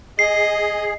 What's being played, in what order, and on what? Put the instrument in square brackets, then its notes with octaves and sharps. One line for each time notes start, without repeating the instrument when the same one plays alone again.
[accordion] G#4 [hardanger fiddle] D#5 [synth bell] C7